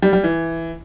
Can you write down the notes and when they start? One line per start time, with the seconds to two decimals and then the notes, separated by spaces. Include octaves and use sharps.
0.02 G3
0.13 G3
0.24 E3